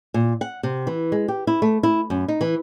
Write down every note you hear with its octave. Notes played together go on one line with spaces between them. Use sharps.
A#2
F#5
C3
E3
G#3
G4
E4
A3
E4
F#2
D#4
E3